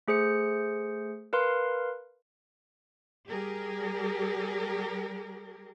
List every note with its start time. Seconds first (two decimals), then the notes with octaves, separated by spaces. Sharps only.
0.08 A3 G#4 C5 C#7
1.33 A#4 B4 F5 C6
3.28 G3 G4 G#4 A#4